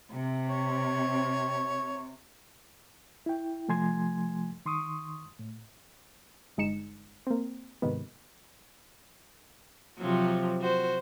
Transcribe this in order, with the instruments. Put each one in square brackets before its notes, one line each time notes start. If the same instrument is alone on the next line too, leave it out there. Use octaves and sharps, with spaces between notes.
[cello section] C3
[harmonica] C#5
[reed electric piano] E4 G5
C3 F3 A3 G#5 C6 G#6
D#3 C6 C#6 D#6
A2
[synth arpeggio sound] G1 G#3 D#4 C#7 E7
A#3 C4
G#2 C3 D#3 B3
[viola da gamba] C3 F3 F#3
F#4 C5